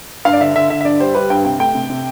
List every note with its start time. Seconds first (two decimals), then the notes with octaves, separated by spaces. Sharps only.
0.25 G2 F5
0.33 D5
0.40 D3 E5
0.55 D3 E5
0.70 D3 E5
0.81 E5
0.85 G2 D5
1.00 G3 C5
1.15 G3 B4
1.30 G2 G5
1.45 C3 G5
1.60 A3 G5
1.75 C3
1.90 C3